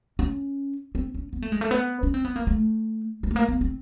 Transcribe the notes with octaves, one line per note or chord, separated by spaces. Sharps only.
C#4
C4
C#4
B3
A3
G#3
A3
B3
C#4
C4
B3
A#3
A3
G#3
A3
A#3
B3
C4